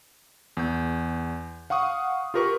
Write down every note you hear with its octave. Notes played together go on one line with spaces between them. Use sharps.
E2 G6
F5 F#5 C#6 D#6
F4 G4 A#4 B4 C#6